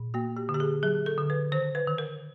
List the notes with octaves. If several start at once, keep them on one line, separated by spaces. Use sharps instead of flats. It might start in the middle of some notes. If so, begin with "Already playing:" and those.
Already playing: A#2
A#3 F#4
G4
D3
G4
G#4
F#3 G#4
A4
D3
B4
D#3 C5
B4
D#3
A#4